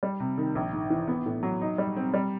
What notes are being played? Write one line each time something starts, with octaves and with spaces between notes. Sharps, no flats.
G3
C3
D#3
A#1
G#2
E3
B3
A2
F#3
D#4
G3
C4
G3